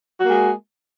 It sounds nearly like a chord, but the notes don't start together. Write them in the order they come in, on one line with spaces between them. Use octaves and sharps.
F#4 A#3 G#3